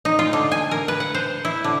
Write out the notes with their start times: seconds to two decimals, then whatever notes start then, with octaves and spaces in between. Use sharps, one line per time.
0.05 D#4
0.19 F4
0.33 D3
0.52 G#5
0.71 A#4
0.88 B4
1.00 F#5
1.14 C5
1.45 E4
1.64 D3